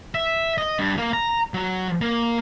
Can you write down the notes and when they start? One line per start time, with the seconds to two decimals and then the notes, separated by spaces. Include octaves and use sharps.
0.14 E5
0.58 D#5
0.79 G2
0.98 A#3
1.13 A#5
1.54 F#3
2.01 A#3